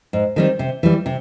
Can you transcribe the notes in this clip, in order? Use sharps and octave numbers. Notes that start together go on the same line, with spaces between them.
G#2
D#3 G3 C4
C3
E3 G3
C3